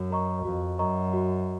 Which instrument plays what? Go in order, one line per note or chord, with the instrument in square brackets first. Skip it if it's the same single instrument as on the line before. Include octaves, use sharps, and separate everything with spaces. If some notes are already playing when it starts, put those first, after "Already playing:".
Already playing: [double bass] F#2 [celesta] F#4
[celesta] A#4 D#5 A#5 C#6
[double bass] F2 [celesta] F#4
[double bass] F#2 [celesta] A#4 D#5 A#5 C#6
[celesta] F#4